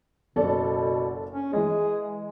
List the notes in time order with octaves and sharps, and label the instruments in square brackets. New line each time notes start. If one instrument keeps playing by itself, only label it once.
[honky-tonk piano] F#1 A4 D5 [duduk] B2
[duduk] C#4
[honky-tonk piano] E3 G#3 [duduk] G#4